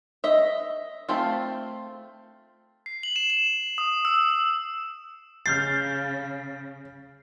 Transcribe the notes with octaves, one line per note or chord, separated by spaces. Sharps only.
D#5 E5
A3 C4 F4
C7
F#7
E7
E7
D#6
E6
C#3 F6 G6 A6 C7